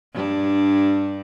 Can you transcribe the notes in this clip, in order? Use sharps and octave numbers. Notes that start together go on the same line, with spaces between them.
G2 D4